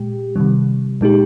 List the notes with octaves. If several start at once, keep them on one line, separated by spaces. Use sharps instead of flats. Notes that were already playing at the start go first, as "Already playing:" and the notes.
Already playing: A#2 G#3 G4
C3 D#3 G3
A#2 G#3 D#4 G4